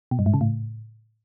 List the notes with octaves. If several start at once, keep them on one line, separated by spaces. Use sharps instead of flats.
B2
G2
G#2
C#3
A2